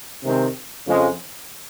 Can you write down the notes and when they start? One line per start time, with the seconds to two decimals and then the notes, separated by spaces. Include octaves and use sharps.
0.23 C3 D#3 G#3 C4
0.86 F2 C#3 F3 G#3